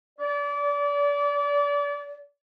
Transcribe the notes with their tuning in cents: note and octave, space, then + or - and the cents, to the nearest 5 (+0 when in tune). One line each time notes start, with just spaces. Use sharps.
D5 -30